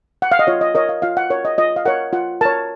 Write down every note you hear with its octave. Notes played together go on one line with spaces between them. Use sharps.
F#5
F5
D#5
F4 C#5
D#5
A#4 C#5 D#5
F5
F4 F5
F#5
A#4 C#5
D#5
F4 D#5
F5
A#4 C#5 F#5
F4 F#5
A#4 C#5 A5